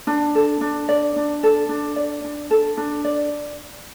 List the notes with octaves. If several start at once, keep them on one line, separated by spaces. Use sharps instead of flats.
D4
A4
D4
D5
D4
A4
D4
D5
D4
A4
D4
D5